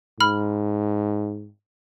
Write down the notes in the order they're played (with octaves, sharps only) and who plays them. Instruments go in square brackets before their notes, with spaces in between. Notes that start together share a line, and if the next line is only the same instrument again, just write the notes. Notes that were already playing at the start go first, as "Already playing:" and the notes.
[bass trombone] G#2 [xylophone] B5 F6